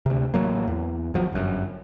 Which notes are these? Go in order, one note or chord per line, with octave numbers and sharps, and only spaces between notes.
D2 C3
A1 F3 F#3 A#3
E2
G#1 F3 F#3
G1 F#2